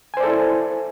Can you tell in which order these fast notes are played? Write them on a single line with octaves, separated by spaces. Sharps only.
G#5 C5 D5 A4 E4